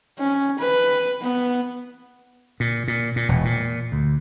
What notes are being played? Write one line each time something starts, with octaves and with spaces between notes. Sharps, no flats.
C#4
B4
B3
A#2
A#2
A#2
E1
A#2
D2